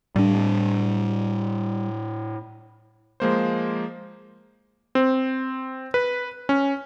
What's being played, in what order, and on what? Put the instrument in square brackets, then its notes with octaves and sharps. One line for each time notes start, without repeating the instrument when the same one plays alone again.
[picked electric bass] A2 D4 [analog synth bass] G3
[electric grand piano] F3 G#3 A#3 C5
C4
B4
C#4